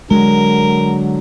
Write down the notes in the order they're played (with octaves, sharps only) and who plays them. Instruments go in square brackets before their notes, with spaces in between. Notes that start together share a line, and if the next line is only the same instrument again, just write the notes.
[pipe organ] D3 F#3 [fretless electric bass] G#3 [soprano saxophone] A#4